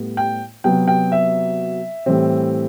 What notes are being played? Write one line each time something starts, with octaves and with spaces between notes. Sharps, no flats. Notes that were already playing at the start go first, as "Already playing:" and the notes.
Already playing: A2 G3 B3
G5
C3 F#3 B3 G5
G5
E5
A2 E3 G3 C4